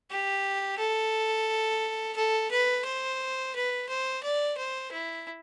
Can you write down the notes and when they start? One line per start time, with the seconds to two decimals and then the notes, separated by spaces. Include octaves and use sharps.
0.11 G4
0.78 A4
2.16 A4
2.51 B4
2.85 C5
3.55 B4
3.89 C5
4.23 D5
4.58 C5
4.92 E4